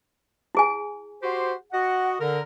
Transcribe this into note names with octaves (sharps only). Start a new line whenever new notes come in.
E4 G#4 G#5
F#4 G4 C5
F#4 D#5 F#5
D3 A#4